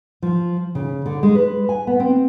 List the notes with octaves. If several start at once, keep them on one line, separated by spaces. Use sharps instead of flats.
F3
C#3
D3
G#3
B4
G#5
B3
C4